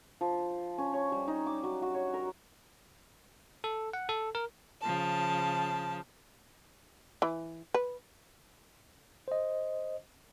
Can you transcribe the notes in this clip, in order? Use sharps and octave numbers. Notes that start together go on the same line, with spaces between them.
F3
C#4
C#5
G3
D#4
D6
F#3
F#4
C#5
A#4
A4
F#5
A4
A#4
C#3 F3 A5
E3
B4
C5 D#5